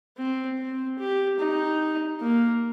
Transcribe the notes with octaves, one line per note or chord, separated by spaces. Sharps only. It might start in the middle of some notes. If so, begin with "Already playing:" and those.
C4
C4
G4
D#4
A#3